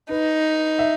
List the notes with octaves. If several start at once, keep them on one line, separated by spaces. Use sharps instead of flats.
D#4 B4
E5